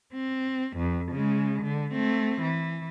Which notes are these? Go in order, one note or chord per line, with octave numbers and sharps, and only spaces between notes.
C4
F2
C#3 G#3
D3
A3 C4
E3